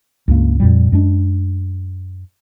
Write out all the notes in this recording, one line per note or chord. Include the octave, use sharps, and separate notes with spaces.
C#2 G2 A#3
F2 A#2 G3
F#2 G#3 D4